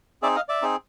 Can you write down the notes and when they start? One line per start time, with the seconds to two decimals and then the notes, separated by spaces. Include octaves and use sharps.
0.22 C4 D#4 G#4 D5 E5
0.35 D#5 F5
0.49 D5 E5
0.62 C4 D#4 G#4